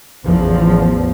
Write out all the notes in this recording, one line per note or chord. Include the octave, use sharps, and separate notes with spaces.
A1 E2 F3